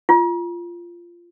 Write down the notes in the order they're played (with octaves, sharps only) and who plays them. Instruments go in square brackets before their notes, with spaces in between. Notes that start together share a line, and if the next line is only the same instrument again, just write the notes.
[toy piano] F4